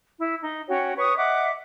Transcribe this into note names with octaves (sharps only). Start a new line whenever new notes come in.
E4
D#4
C#4 F#4 C#5 G5
B4 C#5 C#6 D#6
D#5 E5 F#5 D6